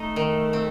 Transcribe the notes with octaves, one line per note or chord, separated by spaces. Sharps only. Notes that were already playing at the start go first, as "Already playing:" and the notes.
Already playing: A3 D#4
D#3
C4